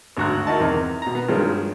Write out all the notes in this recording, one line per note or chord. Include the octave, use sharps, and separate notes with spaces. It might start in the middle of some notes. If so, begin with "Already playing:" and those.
G#1 D2 F#4 A#5 F#6
D#4 E4 F#4 A#4 D#5 A5
E2 C3 D#3 A#4
B2 A#5
B3
G2 D#3 F3 F#3 G#3